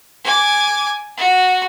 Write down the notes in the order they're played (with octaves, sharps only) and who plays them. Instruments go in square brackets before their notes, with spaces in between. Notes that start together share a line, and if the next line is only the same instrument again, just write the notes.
[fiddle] G#5 D6
F#4